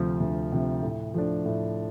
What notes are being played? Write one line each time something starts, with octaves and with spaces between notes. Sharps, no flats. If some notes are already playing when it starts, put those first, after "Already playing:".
Already playing: D2 C3 F3
D2
C3 F3
A2
F3 A3 D4
A2